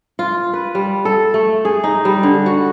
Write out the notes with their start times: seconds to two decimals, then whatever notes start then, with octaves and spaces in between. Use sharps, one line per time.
0.19 F4
0.53 B4
0.75 G3
1.05 A4
1.34 A3
1.65 G#4
1.84 D#4
2.05 G3
2.23 D3
2.46 F#4